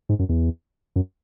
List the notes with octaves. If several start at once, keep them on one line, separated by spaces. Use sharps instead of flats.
G#2
F#2
E2
F#2